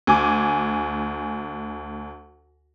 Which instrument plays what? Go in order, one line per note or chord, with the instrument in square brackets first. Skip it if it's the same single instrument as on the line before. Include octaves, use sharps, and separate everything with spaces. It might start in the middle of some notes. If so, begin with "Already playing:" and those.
[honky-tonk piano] D2 G#5 D6